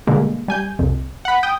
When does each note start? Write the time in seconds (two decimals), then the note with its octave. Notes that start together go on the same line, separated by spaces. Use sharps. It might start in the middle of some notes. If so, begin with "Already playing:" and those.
0.07 B2 D3 G3 G#3 A#3
0.48 G3 G#5 G6
0.79 C2 F2
1.25 F#5 B5
1.43 G5 D#6